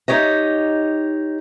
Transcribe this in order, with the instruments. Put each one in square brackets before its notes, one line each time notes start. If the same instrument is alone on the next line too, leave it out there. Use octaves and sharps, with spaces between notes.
[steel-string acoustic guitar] D#4 G4 C#5 D#5